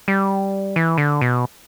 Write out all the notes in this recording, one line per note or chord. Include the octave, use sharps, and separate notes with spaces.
G3
E3
D3
B2